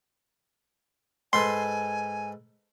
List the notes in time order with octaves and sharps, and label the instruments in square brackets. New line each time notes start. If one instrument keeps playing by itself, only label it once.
[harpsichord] G#2 A4 B4 [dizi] G#5 [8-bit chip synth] C6